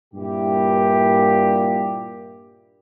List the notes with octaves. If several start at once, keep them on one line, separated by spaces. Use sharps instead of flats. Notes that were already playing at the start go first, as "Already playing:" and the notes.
G2 A#2 E4 G4